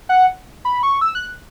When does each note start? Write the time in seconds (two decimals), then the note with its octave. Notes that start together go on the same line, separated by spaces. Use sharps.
0.09 F#5
0.65 B5
0.83 C#6
1.01 E6
1.15 F#6